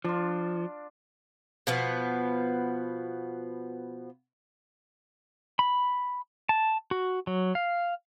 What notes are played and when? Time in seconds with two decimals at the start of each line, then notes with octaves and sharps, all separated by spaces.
0.05 F3 D4 F4
1.67 B2 F3 B3
5.59 B5
6.49 A5
6.91 F#4
7.27 F#3
7.55 F5